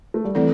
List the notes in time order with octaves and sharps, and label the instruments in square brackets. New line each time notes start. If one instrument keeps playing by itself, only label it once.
[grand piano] A3
G3
[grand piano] E3 [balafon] A3 C4 A4 D5